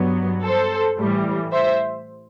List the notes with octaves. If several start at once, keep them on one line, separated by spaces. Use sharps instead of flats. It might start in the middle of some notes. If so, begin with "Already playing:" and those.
Already playing: G2 F#3 B3
A4 C5
A2 E3 G3
C5 E5